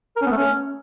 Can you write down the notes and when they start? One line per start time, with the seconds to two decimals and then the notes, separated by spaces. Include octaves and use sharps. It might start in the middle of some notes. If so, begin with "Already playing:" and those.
0.16 A#4
0.21 C#4
0.26 B3
0.31 A3
0.36 C#4